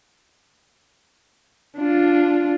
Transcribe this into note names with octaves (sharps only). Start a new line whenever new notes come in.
D4 F4